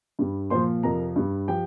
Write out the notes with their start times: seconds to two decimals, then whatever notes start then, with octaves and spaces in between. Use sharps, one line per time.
0.19 G2 G3
0.50 A#2 F3 C5 C6
0.83 F2 C3 F3 A#4 A#5
1.16 G2 G3
1.48 F3 G4 G5